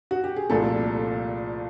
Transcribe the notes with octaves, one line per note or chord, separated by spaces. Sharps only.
F#4
G4
G#4
C2 A#2 F3 A3 A4